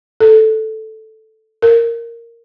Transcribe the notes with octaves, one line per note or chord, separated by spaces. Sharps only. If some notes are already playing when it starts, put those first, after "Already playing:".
A4
A#4